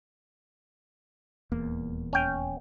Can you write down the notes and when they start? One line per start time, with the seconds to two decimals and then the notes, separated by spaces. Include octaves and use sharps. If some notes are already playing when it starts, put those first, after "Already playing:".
1.52 D#1 E2 A#3
2.13 C#4 G5